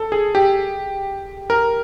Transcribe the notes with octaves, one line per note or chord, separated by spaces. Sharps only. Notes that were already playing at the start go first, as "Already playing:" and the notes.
Already playing: A4
G#4
G4
A#4